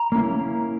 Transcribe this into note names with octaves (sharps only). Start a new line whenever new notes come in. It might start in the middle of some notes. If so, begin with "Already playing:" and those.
Already playing: A#5
A#3 C#4 E4